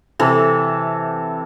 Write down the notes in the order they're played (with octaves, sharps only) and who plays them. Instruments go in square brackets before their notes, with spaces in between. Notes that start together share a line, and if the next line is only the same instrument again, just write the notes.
[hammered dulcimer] C3 E3 A4